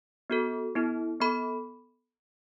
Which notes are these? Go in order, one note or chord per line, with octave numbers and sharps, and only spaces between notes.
B3 F#4 A4
B3 E4 A4
B3 A4 B5